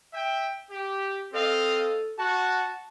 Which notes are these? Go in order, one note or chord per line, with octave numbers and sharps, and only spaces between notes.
E5 G5
G4
C4 A4 D#5 F5
F#4 A5